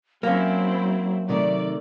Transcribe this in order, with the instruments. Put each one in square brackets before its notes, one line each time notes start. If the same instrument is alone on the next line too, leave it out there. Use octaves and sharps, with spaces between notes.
[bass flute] F#3 [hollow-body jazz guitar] A#3 C#4 [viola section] C4 E4
[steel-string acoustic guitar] C3 D#3 A3 [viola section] D5